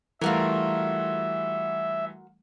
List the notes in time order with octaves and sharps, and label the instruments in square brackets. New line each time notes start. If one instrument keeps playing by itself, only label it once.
[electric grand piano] E3 G3 A3 [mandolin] F4 F#4 A#4 [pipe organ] E5